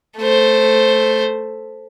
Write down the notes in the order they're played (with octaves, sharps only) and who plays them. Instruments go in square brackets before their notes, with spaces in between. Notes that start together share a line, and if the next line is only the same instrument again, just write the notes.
[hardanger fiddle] A3 C5